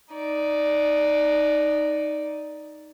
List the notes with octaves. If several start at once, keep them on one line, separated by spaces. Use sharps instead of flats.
D#4 D5